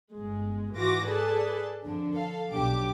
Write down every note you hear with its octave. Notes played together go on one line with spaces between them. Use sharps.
G1 G#3
G#2 E3 F4 F#4 D6 A#6
G#4 A4 B4 D5 A5
F2 D3 D4
A4 F5
B1 D4 G4 D6